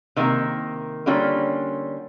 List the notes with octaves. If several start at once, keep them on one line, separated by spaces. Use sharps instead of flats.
C3 D#3 A#3
D3 G3 A#3 C#4 F4